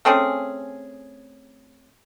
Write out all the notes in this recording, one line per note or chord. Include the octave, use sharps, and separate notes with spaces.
A3 C4 C#4 G#4